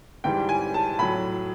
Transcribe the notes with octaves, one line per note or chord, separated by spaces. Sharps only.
G#2 E3 G3 G5
G#5
A5
A2 F#3 B5